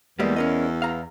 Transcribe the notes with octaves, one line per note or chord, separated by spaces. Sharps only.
E2 G3 G#3 A#3
C#4 A#4 D#5
F5 A#5